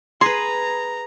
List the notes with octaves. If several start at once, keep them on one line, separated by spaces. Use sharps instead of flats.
G#4 B4 A#5 C6